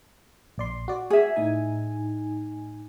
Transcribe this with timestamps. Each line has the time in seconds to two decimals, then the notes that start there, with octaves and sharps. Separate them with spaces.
0.58 A#1 D5 C6
0.88 F#4 D5
1.10 G#4 E5
1.36 A2 D#4 G#5